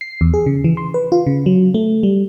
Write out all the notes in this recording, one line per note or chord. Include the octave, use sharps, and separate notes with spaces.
C7
E2
G#4
C#3
E3
C6
B4
F4
C#3
F#3
A3
G3